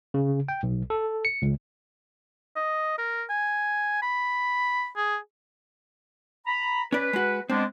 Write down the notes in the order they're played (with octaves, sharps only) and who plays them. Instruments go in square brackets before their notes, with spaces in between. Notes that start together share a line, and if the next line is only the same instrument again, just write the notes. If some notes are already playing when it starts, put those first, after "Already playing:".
[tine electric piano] C#3
G5
B1
A4
C#7
C#2
[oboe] D#5
A#4
G#5
B5
G#4
[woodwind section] A#5 B5
[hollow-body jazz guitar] C#4 D5 [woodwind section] B4
[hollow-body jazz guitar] G#3 F#4
[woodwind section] G#3 B3 D4 [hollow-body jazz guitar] C4